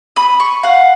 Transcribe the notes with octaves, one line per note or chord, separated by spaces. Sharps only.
B5 D#6
C#6
F5 F#5